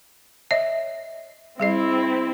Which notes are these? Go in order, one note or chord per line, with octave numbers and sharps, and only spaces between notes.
C#5 D#5 E5
G3 C4 E4 G#4 D#5